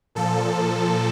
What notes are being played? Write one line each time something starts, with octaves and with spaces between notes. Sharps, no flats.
A#2 F3 A4